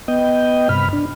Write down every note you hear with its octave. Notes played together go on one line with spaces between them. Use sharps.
B3 D#5 G5
G2 C3 B5 F6
D4